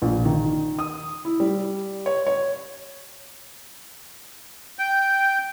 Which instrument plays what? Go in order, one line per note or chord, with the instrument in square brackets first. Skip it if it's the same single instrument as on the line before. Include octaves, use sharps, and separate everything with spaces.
[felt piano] A#1
D#3
D#6
E4
G3
C#5
C#5
[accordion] G5